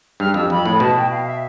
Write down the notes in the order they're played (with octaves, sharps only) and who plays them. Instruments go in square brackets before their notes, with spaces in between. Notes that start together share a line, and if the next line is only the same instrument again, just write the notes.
[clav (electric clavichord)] G2 [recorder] F6
[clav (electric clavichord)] F2 [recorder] E6
[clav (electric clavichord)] F2 [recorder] B5
[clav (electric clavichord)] A2
[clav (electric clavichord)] B2 [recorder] A5
[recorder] G5
F5
E5